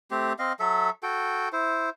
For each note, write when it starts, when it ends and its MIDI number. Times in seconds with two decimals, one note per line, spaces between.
0.11 0.33 57
0.11 0.33 60
0.11 0.33 67
0.39 0.53 60
0.39 0.53 75
0.39 0.53 77
0.60 0.90 54
0.60 0.90 69
0.60 0.90 76
1.03 1.49 66
1.03 1.49 69
1.03 1.49 79
1.53 1.90 64
1.53 1.90 72